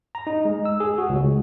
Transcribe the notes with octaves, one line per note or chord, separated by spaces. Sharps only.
A#5
D#4
G#3
E6
G#4
F#4
C#2